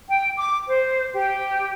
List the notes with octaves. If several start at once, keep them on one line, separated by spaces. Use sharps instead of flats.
G5
D6
C5
G4